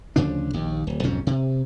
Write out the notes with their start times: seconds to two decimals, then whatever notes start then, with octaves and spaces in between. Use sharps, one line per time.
0.16 D2 C#3 F3 D4
0.53 A#1 D#2
0.87 D1
1.03 B1 F2 G#2 C#4
1.27 C3